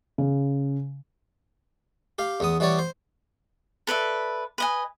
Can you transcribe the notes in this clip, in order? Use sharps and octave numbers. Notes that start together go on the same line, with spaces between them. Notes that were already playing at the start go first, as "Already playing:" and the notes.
C#3
G4 F5
E2 B3 D#6
E3 G3 B3 C#5 D5
C5
A4 B4 D5 E5
B4 D#5 G#5